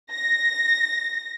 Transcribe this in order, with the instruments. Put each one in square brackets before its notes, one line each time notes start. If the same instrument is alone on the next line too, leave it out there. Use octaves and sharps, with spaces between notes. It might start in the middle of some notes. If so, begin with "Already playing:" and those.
[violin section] A#6